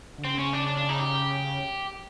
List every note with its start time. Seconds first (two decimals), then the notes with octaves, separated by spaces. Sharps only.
0.18 D3
0.24 C#3 C4
0.39 C#4
0.53 D4
0.67 D4
0.78 D4
0.89 D#4
0.99 G4